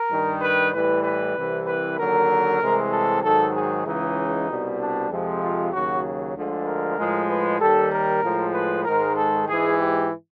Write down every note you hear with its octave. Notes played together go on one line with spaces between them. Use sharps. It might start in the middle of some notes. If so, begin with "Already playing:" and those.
Already playing: A#4
G2 D#3 G3
B4
A2 E3 G3 B4
B4
C2 C3 E3
B4
D#2 D3 F#3 A#4
C2 C3 E3 G#3
A4
G#2 D#3 F#3 A4
G#4
C#2 C#3 E3 G#3 D#4
C2 B2 G3
D4
F2 C3 F3 G#3
F4
D#2 C#3 F#3 F#4
D2 D3 F3 G#3
A#4
A2 F3 G#3
B4
D#2 D#3 G3 A4
A#4
A2 F3 G#3
B4
G#2 D#3 G#3 A#4
A4
G#2 E3 G#3 G#4
G4